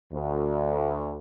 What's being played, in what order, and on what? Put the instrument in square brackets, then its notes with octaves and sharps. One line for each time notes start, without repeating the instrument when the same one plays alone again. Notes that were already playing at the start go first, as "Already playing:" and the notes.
[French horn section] D2